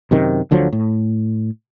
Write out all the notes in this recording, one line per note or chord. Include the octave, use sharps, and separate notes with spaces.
F#2 C3 D#3
D2 D3 F3 F#3
A2